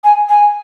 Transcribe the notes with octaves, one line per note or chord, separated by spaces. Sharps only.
G#5
G#5